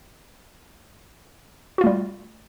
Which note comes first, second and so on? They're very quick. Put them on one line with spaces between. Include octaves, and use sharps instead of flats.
F#4 F4 A3 G3